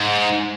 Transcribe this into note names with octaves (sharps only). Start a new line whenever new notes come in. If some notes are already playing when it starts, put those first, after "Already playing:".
Already playing: G#2